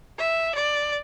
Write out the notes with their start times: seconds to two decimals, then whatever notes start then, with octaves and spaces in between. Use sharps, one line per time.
0.18 E5
0.55 D5